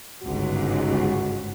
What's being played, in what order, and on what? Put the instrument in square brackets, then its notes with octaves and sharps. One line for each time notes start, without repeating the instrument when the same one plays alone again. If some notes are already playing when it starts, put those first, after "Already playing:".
[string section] G1 C#2 G#2 [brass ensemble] F#4